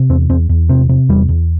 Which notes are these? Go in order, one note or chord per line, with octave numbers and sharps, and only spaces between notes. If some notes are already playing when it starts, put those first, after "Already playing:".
Already playing: C3
E2 C4
E2 C4
E2
C3 C4
C3
E2 G3
E2